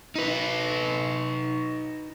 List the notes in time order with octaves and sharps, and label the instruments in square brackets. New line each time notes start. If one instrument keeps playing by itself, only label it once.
[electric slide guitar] D#4 B4